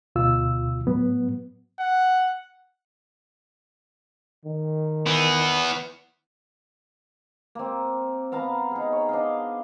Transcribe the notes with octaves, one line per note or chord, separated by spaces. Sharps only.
D2 B2 F4 E6
A2 F#3 B3
F#5
D#3
E3 B3
A#3 C4
B3 F5 A5 A#5
D#4 G#4
C#5
D4 D#5 F5